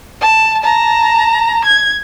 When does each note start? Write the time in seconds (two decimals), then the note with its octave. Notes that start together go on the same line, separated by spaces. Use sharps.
0.21 A5
0.64 A5 A#5
1.65 G#6